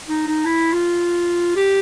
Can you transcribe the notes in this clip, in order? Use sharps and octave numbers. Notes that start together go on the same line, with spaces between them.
D#4
D#4
E4
F4
G4